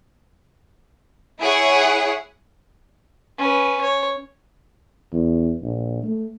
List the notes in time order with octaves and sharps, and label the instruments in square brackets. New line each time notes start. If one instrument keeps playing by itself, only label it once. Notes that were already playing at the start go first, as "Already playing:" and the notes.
[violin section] E4 G#4 C#5 F#5
[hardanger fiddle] C#4 B4
C#5
[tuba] E2
A#1
A3